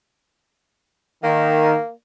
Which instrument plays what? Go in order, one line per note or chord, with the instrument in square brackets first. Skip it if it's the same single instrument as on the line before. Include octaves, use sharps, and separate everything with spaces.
[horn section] D#3 [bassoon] A#3